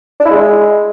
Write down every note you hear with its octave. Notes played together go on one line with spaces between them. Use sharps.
D4
E4
G#3